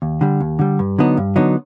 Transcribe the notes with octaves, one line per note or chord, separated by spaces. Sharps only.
D#2
D3 G3
D#2
D3 G3
G2
D3 F#3 B3 D#4
G2
D3 F#3 B3 D#4